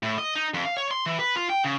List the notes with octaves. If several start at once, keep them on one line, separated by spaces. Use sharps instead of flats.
A2
D#5
D#4
F2
F5
C#5
C6
E3
B4
F4
G5
C#3